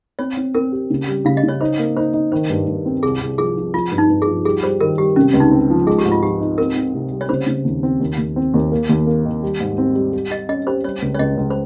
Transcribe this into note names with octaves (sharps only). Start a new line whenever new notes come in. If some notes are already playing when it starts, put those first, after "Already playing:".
C4 C#5
C4
C4 A#4
G4
C#3
G3
C#3 F5
D#5
C#3 C#5
D#4 C5
A#3
D#4 C5
D#4
D#3 C5
G2
G2
C4
C2 G#4
C2
F3 G#4
F3
F3 F4
G2
D#4
G2
G#4
F3
G3 G#4
G3 C5
D#3 A#4
G3 G4
C3 C#4
C#2
D#4
C4
F3
G#3 G#4
G4
G#2
F4
F3 G4
D#4
C4 A#4
C4
C3
G3
C#5
C#3 C5
C#3
D#2
C4
D#2
D#2
C4
D#2
A#3
D#2
A#3
D#3
G3
G#2
C4
G3
G4
G4 D#5
C#4 D#5
G4 C5
G3 C#5
C#2
C#5
C#2 D#5
C#2
C5